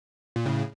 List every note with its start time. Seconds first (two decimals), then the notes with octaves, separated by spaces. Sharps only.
0.36 A#2
0.46 A2 C#3